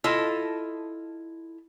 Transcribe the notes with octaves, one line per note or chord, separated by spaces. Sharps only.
E4 F4 A4 D#5